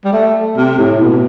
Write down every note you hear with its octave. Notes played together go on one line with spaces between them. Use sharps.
G3
A3
C3
A2
B2